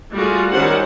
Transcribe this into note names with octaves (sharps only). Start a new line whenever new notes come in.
G3 A3 F4 F#4 G#4
D#3 F#3 G3 C#4 C5 F#5